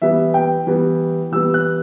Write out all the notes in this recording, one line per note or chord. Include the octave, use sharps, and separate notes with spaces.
E3 G3 B3 E5
G5
E3 G3 B3
E3 G3 B3 E6
F#6